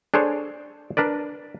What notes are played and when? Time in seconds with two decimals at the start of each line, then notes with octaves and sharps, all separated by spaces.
0.14 D4 G#4 A4 C5 C#5
0.97 D4 A#4 B4 D5